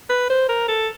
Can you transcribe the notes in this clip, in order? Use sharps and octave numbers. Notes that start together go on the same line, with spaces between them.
B4
C5
A#4
A4